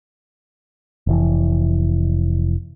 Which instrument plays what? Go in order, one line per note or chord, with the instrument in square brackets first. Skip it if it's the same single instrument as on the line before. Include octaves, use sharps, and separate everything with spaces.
[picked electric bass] F1 E3